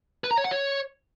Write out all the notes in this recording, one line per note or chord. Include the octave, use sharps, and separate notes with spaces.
B4
A#5
C#5
F#5
C#5